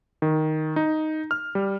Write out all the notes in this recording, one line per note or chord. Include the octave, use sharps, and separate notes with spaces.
D#3
D#4
F6
G3